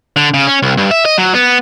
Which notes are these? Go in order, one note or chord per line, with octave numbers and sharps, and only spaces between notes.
D3
C#3
C#4
C2
G2
E5
D#5
F#3
B3